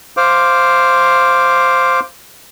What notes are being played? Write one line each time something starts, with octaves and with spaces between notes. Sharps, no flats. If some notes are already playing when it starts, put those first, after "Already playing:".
C5 F5 D6